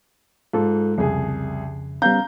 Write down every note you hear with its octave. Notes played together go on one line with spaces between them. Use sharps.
G#2 F4 A4
C2 F2 C#3 G#4
G3 B3 C#4 F5 A#5 G6